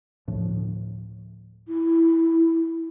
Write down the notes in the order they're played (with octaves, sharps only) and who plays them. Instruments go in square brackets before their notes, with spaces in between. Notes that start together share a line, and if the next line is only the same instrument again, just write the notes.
[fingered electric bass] D2 A2 F3
[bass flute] E4